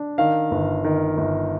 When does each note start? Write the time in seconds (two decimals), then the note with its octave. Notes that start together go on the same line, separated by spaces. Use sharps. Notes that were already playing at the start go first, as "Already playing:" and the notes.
Already playing: D4
0.18 D#3 F5
0.51 G1
0.84 D#3
1.17 G1